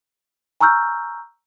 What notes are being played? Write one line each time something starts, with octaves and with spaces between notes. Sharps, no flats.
G#5 A#5 C#6 E6 F6 G6